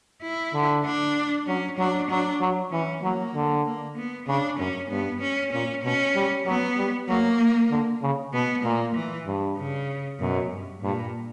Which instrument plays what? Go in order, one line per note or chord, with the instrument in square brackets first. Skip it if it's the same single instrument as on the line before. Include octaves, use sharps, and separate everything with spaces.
[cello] E4
[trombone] D3
[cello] D4
[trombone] F#3 [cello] C#4
[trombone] F#3 [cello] D4
[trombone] F#3 [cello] D4
[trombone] F#3
[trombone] E3 [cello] C#4
[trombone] F#3 [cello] A#3
[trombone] D3
[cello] A#3
B3
[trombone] C#3 [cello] D4
[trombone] F#2 [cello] C#4
[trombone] G2 [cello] B3
[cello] C#4
[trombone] A#2 [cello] C#4
[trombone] B2 [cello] C#4
[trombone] G3
[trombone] F#3 [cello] B3
[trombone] G3
[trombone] F#3 [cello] A#3
[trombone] D3
C#3
[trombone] B2 [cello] B3
[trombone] A#2 [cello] A#3
[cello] E3
[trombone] G2
[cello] C#3
[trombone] F#2 [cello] B2
[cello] G2
[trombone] G2 [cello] A#2